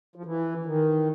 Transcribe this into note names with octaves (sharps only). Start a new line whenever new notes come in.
F3
E3
D#3